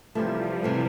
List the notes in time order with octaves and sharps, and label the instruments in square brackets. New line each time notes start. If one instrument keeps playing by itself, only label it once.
[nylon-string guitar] C3 E3 A3 [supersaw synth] F3 G3
[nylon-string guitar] C3 E3 A3